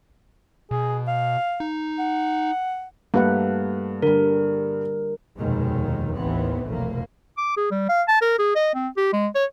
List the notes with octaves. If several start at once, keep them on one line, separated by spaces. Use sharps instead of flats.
B2 G#4
F5
D#4
F#5
G2 A3 A#3 B4 F#5
D3 G3 A#4
F1 D#2 B2 D#3 G3 G#3
A1 D#2 D#3 E3 B3 C4
F1 B1 F2 A3 A#3
D6
G#4
G3
F5
A5
A#4
G#4
D#5
C4
G4
G#3
C#5